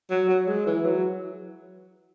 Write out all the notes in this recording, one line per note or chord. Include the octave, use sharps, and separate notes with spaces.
F#3
F#3
G#3
E3
F#3